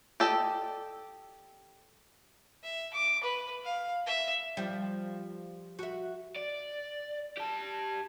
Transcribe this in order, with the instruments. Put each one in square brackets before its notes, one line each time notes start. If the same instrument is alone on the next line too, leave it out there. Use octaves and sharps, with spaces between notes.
[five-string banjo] G4 A4 D5 D#5
[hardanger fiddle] E5
D6
B4
F5
E5
[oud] F3 G3
F#4 E5
[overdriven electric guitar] D5
G4 A5